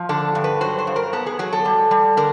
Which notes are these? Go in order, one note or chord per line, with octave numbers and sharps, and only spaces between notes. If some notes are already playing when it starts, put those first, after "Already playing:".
Already playing: F3
D3 A4
G2
B4
F#3 C5
C5
G2
A#4
B3 A4
G#4
F#3 G#4
A4
G3
G3
D3 A#4